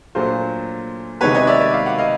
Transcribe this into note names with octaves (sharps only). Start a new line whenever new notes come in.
A#2 F#3 A3 D4 F4 C5
C3 D#3 G#3 B3 B4 C#5
C#5 D#5
D5 E5
D5 E5
F5
F#5
D#5 F5